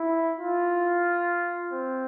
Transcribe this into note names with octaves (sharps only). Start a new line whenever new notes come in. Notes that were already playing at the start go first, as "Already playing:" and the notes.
Already playing: E4
F4
C4